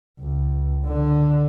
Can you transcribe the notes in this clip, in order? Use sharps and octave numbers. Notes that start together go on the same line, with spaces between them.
C#2
D3